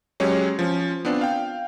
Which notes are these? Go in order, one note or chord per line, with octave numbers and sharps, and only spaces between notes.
F#3 G#3 C#4 G4 C#5
F3 C#4
B3 C4 D4 F4
F5 G5